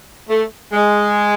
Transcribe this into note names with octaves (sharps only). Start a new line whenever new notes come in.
A3
G#3